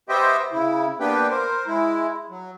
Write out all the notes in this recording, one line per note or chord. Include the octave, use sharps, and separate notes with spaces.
B3 G4 C5 D#5 E5 G5
C#3 E4
A#3 B3 D4 G4 B4 G5
A#4 C5
G#3 E4
F#3